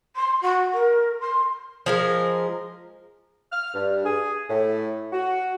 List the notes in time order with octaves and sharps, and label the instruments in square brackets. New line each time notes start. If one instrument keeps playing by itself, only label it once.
[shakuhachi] C6
F#4
A#4
C6
[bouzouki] F3 G#3 A#4
[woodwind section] F6
G2
G#4
A2
F#4